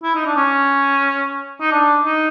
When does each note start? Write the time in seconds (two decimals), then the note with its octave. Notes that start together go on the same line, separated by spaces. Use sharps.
0.03 E4
0.15 D#4
0.25 D4
0.37 C#4
1.61 D#4
1.71 D4
2.05 D#4